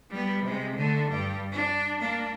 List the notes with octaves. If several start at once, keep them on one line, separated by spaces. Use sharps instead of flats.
G3 B3
C3 G#3
D3 A3
G2 G3
D4
A#3 D4